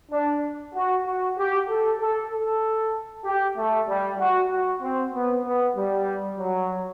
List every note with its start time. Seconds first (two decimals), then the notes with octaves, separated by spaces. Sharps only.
0.11 D4
0.74 F#4
1.05 F#4
1.38 G4
1.69 A4
2.00 A4
2.31 A4
3.25 G4
3.57 A3
3.88 G3
4.19 F#4
4.50 F#4
4.81 C4
5.14 B3
5.44 B3
5.76 G3
6.38 F#3